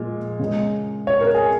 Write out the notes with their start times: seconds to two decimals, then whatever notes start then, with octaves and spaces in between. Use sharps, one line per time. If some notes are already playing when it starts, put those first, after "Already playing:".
Already playing: A#2 F3 G#3
0.39 C#3 G#3
1.07 C#5
1.21 A#4
1.35 G#4